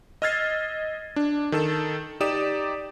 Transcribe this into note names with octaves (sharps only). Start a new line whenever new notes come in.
D#5 E6 F6 G#6 A6 C7
D4
D#3 A4 E7
D#4 G4 D5 D#6 E7